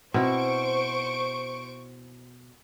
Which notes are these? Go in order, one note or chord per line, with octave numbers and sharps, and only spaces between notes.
B2 C4 E4 C5 C#6 D7